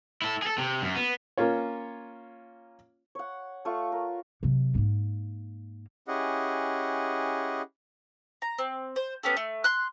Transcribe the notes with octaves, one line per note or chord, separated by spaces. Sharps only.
E4 A4
G#4 A4
C3
F#2
B3
A#3 C#4 F4 C#5
C#5 F#5
A3 F4 C#6
A#4
C3 F#3
G#2 A#3
C#4 E4 G4 G#4 D#5 F#5
A#5
C4
C5
B3 C#4 G4 A4
A3
C6 F#6